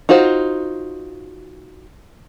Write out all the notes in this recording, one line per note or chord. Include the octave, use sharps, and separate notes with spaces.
D#4 F4 F#4 C5